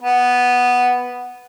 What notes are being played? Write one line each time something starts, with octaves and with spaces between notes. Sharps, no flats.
B3